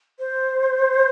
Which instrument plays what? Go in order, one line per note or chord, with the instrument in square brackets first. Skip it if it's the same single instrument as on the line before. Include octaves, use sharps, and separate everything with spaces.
[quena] C5